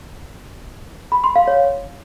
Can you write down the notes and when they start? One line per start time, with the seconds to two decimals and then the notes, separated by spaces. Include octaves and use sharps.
1.12 B5
1.24 C6
1.36 F5
1.47 C#5